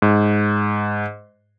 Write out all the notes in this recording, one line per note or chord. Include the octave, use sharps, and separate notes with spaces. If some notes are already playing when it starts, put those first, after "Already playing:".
G#2